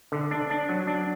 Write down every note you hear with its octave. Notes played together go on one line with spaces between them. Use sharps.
D3
D4
D4
F#3
D4